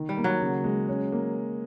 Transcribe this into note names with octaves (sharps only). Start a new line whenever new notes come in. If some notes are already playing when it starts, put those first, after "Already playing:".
Already playing: D#3
G3
A#3
F#3
C#3
G#3
C#4
A#3